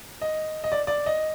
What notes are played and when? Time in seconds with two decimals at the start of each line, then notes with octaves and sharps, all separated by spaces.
0.21 D#5
0.64 D#5
0.72 D5
0.87 D5
1.06 D#5